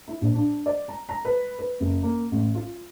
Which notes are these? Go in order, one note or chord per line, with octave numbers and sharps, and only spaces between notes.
E4
A#1
D4
D5
A#5
A#5
B4
B4
F#1
A#3
A1
F4